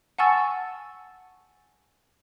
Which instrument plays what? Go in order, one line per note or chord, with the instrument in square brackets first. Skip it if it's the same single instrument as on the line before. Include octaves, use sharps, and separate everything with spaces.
[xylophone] F#5 G#5 A5 C#6 E6 A6